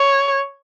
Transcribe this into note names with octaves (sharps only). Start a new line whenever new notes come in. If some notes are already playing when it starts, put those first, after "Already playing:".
Already playing: C#5